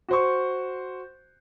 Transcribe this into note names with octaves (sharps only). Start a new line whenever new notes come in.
F#4 C5 C#6